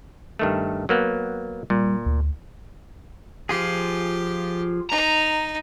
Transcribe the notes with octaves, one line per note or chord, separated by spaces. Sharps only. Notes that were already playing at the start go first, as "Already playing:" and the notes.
G2 D#3 A3
F#3 A#3 B3
A#2 G3
D2
F3 F4 G4 G#4
D#4 A#5